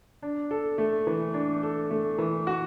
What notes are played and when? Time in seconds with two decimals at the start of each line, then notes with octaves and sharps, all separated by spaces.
0.22 D4
0.51 A4
0.78 A3
1.07 E3
1.34 D4
1.63 A4
1.91 A3
2.18 E3
2.47 F#4